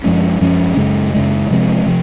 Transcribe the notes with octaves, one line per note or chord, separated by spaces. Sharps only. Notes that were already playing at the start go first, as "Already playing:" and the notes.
F#2 F3 G#3 C#4
F#2 F3 G#3 C#4
F#2 C#3 G#3
F#2 C#3 G#3
C3 F3 G#3 C4
C3 F3